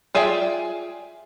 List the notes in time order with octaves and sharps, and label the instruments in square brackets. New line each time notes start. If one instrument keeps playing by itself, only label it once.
[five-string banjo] F4 G#4 D5 E5 G5